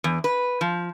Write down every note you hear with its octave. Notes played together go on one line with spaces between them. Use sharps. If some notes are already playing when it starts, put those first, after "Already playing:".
E2
B4
F3